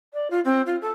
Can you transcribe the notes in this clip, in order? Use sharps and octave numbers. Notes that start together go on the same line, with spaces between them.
D5
F4
C4
F4
A4